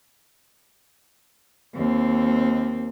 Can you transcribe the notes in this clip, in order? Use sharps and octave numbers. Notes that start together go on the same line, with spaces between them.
D#2 C4